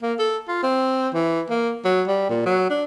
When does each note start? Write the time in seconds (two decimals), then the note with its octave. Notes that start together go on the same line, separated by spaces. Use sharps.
0.02 A#3
0.19 A4
0.48 F4
0.63 C4
1.14 E3
1.50 A#3
1.85 F#3
2.07 G3
2.30 A#2
2.46 F#3
2.70 D4